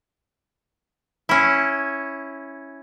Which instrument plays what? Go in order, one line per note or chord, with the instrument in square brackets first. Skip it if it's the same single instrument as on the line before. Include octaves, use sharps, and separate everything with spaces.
[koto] C#4 E4